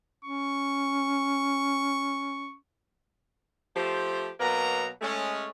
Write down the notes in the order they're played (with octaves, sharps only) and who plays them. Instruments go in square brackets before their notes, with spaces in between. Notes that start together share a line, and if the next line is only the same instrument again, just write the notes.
[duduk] C#4 [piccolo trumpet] C#6
[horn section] F3 A3 G4 C5
B2 F#3 A#3 B4 A#5
G#3 A3 C#4